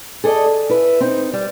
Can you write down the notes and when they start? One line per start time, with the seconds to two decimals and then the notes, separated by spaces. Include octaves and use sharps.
0.24 G#4 A4 D5 D#5
0.46 G#4
0.69 E4 B4
1.01 C4 D#4
1.33 G3